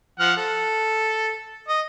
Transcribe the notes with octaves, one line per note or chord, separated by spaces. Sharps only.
F3 F#5 F6
A4
D#5